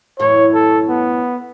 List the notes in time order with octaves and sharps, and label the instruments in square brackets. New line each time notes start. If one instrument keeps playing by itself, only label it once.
[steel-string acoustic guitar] F#2 A2 E3 [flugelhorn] C#5
[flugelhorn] A4
B3